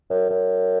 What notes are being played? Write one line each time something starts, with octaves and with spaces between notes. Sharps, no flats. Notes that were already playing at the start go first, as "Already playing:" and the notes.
F#2
F#2